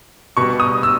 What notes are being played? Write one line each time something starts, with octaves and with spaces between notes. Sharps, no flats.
B2 G3 C#6
D#6
E6